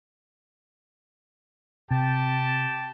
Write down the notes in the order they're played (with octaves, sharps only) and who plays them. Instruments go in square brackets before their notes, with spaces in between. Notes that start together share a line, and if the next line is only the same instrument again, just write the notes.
[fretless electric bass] C3 [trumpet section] G4 G5 A5